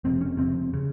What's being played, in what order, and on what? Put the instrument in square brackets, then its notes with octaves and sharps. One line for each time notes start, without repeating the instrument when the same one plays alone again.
[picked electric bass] F#1 F2 C3 C4
C#4
F#1 F2 C3 C4
C#3